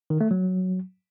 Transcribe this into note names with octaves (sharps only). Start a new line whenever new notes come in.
D#3
A3
F#3